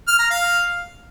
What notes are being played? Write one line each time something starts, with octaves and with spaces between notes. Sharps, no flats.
F6
A#5
F5